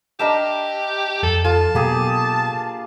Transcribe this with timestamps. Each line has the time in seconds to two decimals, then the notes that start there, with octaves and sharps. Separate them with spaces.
0.20 D4 G4 A#4 D#5 E5 A5 E7
1.23 F2 A4
1.45 F4 A4 A5
1.75 B2 F#3 A#3 B3 G4 G#4